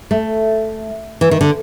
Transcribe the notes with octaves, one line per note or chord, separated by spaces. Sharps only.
A3
E3
D#3
D3